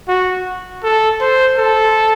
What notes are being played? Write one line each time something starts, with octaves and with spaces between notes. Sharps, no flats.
F#4
A4
C5
A4